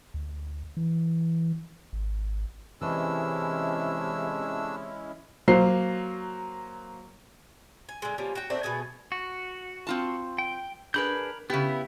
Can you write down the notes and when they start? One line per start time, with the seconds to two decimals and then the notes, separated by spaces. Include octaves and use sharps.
0.14 D2
0.77 E3
1.93 G#1
2.81 C3 E3 G#3 A3 C#4 D4 E4 E6
5.48 F#3 A#3 C5 C7
7.89 G#5
8.02 D3 G#3
8.18 F3 G3 A#3 C#4
8.35 F#4 G5
8.50 A3 A#3 C4 D4
8.63 B2 A3 G#4 G#5
9.12 F#4
9.87 C4 F4 A5
10.38 G5
10.94 D4 G#4 A#4 B4 B5 G6
11.50 C#3 B3 E4 G4